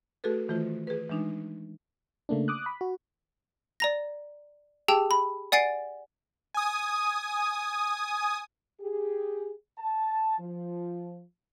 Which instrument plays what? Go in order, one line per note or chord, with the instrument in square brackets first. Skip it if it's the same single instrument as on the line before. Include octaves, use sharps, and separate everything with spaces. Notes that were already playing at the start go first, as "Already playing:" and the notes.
[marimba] A3 F#4 G#4 A4 B4
D#3 E3 A3 F4 C5
G#4 B4
E3 G#3 D4 D#4
[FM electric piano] C#3 A3 A#3 D4
D6 D#6 F#6
B5
F#4
[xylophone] D5 A#5 A#6
G4 G#4 G5 A5 E6
B5
D5 F#5 G#5 A6 C7 D7
[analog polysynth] G#5 D#6
[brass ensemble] G4 G#4
A5
F3